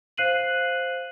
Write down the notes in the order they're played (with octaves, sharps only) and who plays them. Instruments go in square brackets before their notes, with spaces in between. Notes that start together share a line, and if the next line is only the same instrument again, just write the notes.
[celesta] C5 F5 F#6 C7 D#7 F#7